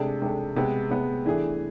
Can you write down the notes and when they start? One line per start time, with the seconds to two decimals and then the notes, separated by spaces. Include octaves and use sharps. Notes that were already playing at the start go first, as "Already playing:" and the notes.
Already playing: C3 G#3 D4 A4
0.22 C3 G#3 D4 A4
0.56 C3 G#3 B3
0.91 C3 G#3 B3
1.26 E3 A3 D4 G#4